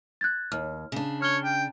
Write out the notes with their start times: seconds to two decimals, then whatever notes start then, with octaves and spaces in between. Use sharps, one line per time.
0.21 F#6 G#6 A6
0.52 D#2 F6
0.92 C#3 D4
1.22 C#5 F6 G7
1.44 G5